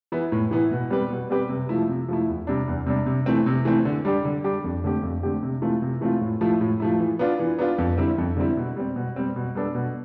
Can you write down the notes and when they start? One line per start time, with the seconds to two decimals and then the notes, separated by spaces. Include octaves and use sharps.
0.12 E3 B3 E4
0.32 A2
0.51 E3 B3 E4
0.71 B2
0.90 G3 C4 G4 B4
1.10 B2
1.30 G3 C4 G4 B4
1.49 C3
1.69 F3 A3 E4
1.89 C3
2.09 F3 A3 E4
2.27 E2
2.47 C3 G3 D4
2.68 E2
2.86 C3 G3 D4
3.06 C3
3.26 E3 A3 C4
3.46 C3
3.65 E3 A3 C4
3.85 D3
4.05 G3 D4 G4
4.25 D3
4.44 G3 D4 G4
4.64 F2
4.84 D3 A3 C4 G4
5.03 F2
5.23 D3 A3 C4 G4
5.43 C3
5.62 E3 A3 C4 F4
5.82 C3
6.01 E3 A3 C4 F4
6.21 A2
6.41 F3 A3 E4
6.61 A2
6.80 F3 A3 E4
6.99 E3
7.19 B3 D4 F4
7.39 E3
7.59 B3 D4 F4
7.78 F2
7.98 D3 G3 C4 E4
8.18 F2
8.37 D3 G3 C4 E4
8.57 B2
8.76 G3 C4
8.96 B2
9.16 G3 C4
9.36 B2
9.55 G3 B3 D4 A4
9.74 B2